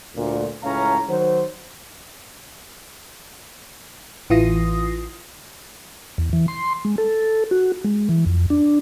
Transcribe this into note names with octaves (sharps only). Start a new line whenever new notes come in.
D2 A#2
C#2 A2 C#4 F5 A#5
D#3 F#3 C5
A1 E3 F4 D#6 A#6 C7
E2
E3
C6
G#3
A4
F#4
G#3
E3
F2
D4